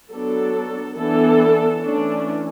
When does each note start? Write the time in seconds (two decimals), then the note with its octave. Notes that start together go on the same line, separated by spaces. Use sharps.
0.10 F#3 B3 D4 A4
0.97 E3 B3 D4 A4
1.82 E3 A3 C#4 D4